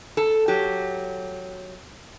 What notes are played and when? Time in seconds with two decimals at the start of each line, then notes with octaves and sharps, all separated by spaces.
0.17 A4
0.48 F#3 G4